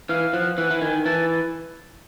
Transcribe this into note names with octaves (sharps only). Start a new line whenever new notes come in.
E3 F5
F3 F#5
E3 F#5
E3
D#3 G#5
E3 A5